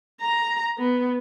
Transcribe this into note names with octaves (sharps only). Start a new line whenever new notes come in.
A#5
B3